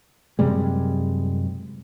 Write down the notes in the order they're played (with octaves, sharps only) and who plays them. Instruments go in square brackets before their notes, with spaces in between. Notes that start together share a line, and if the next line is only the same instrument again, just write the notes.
[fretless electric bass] F#2 C3 G3 G#3